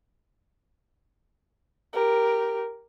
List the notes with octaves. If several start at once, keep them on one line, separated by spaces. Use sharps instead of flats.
G4 A#4